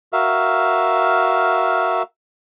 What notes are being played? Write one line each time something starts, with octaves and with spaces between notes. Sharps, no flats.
F#4 A#4 E5 F5